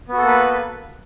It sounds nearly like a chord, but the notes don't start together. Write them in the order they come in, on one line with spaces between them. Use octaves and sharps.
B3 F#4 A4 A#3 B4